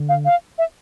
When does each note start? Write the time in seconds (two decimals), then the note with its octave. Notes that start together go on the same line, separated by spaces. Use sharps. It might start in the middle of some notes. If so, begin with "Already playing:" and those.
Already playing: D3
0.09 F5
0.25 F5
0.58 E5